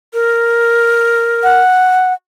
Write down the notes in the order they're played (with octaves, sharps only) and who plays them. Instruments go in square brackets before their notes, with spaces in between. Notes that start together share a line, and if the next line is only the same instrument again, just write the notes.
[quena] A#4
[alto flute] F#5